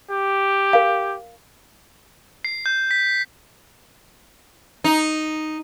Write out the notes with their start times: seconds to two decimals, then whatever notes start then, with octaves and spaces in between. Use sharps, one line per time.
0.11 G4
0.73 A#4 F5
2.45 C7
2.66 G6
2.91 B6
4.84 D#4